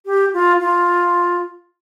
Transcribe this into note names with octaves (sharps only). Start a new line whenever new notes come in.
G4
F4
F4